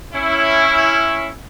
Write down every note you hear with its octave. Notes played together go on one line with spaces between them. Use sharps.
C#4 E4